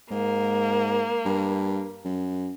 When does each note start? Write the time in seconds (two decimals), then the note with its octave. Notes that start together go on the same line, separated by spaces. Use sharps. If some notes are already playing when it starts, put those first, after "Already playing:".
0.11 G#2 A#3
1.25 G2
2.05 F#2